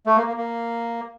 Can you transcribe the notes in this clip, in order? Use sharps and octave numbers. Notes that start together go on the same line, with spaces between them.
A3
A#3
A#3
A#3